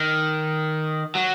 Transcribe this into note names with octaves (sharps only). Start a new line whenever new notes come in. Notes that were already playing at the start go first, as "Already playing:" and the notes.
Already playing: D#3
F#3